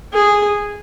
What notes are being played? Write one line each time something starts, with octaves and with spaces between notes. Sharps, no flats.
G#4